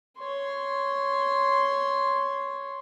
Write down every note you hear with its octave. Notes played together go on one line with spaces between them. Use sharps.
C#5 C6